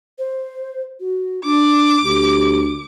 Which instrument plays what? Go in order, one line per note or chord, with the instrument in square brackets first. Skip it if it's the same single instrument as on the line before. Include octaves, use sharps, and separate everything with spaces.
[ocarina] C5
F#4
[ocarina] D4 [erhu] D6
[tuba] D2 [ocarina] G4